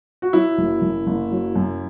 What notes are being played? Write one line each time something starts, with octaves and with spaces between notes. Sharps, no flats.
F#4
F#3 E4
F#1
F#1
F#1
F#3
F#2